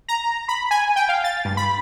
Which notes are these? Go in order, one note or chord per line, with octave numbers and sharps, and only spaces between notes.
A#5
B5
G#5
G5
F5
A6
G2
B5